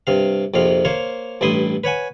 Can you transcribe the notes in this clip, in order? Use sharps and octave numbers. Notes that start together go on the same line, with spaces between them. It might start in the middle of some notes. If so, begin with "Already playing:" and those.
G2 C3 F5
A#1 F2 C3 F5
A#3 C5 C#5 F5
A1 G2 E4 C6 D#6
B4 C#5 F#5 G#5